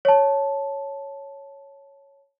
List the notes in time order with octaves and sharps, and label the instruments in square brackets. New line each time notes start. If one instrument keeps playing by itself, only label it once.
[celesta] C#5 A5